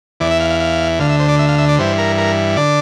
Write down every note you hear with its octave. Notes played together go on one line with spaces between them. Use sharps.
E2 E3 D5
E5
F5
F5
F5
D2 D3 F5
E5
C5
D5
E5
F5
E5
D5
G2 E3 C5
A#4
A#4
D3 D5